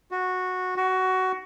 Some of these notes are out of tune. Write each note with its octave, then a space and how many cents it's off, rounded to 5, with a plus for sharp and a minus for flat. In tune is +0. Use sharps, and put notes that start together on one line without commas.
F#4 -10
F#4 +15